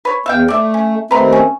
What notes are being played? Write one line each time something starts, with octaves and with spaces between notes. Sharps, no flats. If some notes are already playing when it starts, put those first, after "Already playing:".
B4 C#5
E2 E5 F5 G5
A3 D5 E5
C#4
D#2 A3 C4 B4 A#5 C6
C#4